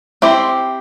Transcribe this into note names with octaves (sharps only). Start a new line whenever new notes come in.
C4 E4 G4 C5